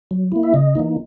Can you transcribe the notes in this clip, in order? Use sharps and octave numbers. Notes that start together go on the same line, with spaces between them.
F#3
A#3 E4
E5
C#3 D#5
E3 A#3 D#4